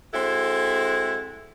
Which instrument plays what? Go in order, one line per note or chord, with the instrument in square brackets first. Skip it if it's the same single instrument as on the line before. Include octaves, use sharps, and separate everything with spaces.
[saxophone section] G#3 C4 E4 F#4 A4